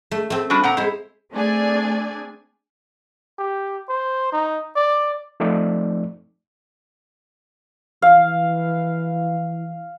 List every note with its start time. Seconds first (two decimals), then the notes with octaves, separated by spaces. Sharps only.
0.11 A3
0.30 A3 C4
0.50 G3 D4 F#4
0.64 A#2 F#5 A#5
0.77 G#3 E4 C5
1.32 A3 C4 D4 G#4 D5 G#5
3.38 G4
3.89 C5
4.32 D#4
4.76 D5
5.40 F3 A3 C4 D#4 D5
8.02 E3 F5